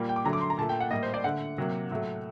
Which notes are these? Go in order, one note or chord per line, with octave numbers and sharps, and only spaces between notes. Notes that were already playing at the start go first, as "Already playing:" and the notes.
Already playing: A#2 G3 A#3
G5
D6
D3 F#3 A3 A#5
D6
C6
A#5
A#2 A3 A5
G5
F#5
A2 G3 A#3 D#5
C5
D5
D3 A3 F#5
C3 F#3 A#3
A2 F#3 A3